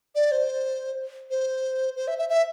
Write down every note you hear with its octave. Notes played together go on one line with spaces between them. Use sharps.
D5
C5
C5
C5
E5
E5
E5